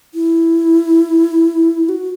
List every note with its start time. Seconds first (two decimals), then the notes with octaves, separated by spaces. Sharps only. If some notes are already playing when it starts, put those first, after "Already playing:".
0.14 E4
1.89 F#4